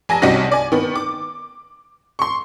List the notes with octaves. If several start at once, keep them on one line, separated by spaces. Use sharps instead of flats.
F1 G#5 A5 A#6
C2 C3 C#4 D#4 F#4 A#6
D5 G#5
D#3 B3
D6
C6 C#6